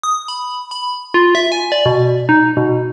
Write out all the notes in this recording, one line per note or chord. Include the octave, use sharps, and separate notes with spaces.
D#6
B5
B5
F4
E5
G#5
D5
B2
D#4
B2